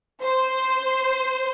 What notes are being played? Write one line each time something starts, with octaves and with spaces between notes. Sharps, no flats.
C5